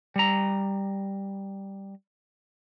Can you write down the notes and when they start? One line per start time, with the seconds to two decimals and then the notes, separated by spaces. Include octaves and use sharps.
0.16 G3 A#5